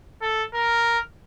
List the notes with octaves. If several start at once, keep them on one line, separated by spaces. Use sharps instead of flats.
A4
A#4